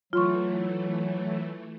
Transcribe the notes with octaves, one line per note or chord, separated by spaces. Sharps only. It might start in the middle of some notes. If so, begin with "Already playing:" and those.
E3 F#3 A3 F4 C6 C#6